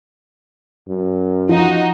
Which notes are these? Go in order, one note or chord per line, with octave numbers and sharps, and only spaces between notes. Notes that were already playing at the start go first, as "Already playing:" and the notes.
F#2
F3 D#4 F#4